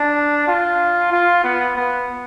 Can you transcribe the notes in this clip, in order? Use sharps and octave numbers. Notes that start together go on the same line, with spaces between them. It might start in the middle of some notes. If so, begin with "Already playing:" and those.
Already playing: D4
F4
F4
B3
B3